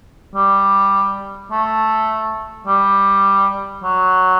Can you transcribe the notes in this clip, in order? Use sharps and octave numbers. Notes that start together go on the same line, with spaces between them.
G3
A3
G3
F#3